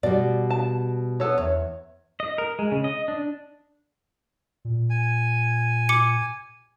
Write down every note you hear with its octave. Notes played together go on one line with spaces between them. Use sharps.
B2 G3 D5
A5
B3 A4 C#5
E2 C#5
D#5
A#4
G#3
C#3
D#5
D4
A#2
G#5
D6 C#7